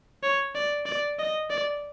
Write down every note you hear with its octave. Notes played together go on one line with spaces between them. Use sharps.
C#5
D5
D5
D#5
D5